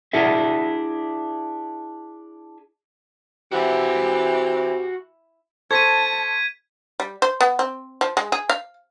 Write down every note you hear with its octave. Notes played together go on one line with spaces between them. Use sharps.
D4 E4 G#4 E5
E3 C4 F#4 G4 E5
A4 C5 A5 C#6 G#6 B6 D#7
G3
C5
B3
C4
F3
G#3
G#4
F5